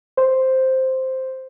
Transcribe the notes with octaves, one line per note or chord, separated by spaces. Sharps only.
C5